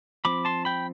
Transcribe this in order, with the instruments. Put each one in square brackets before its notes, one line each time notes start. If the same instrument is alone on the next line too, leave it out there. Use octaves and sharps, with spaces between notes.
[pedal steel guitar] F3 C4 B5 D6
A5 C6
G5 B5